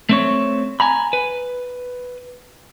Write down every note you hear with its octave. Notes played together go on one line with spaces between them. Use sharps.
A3 C4 C#5
G#5 A#5 B5
B4